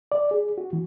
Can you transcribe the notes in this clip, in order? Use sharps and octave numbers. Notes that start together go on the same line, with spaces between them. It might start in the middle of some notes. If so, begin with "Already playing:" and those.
D5
G#4
F#4
E3